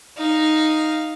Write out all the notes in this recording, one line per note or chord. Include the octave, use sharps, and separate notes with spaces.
D#4 F5